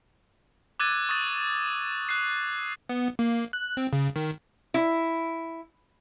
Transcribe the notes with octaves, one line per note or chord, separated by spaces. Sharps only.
D6 E6 F#6 G#6 A6 D#7
C#6 D#6 A6
F#6 C7
B3
A#3
F#6
C4
C#3
D#3
E4